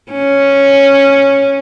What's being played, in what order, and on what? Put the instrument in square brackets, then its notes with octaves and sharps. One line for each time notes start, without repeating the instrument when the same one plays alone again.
[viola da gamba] C#4